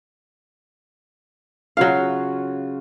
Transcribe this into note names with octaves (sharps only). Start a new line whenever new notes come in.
C#3 F#3 F4 F#4 F5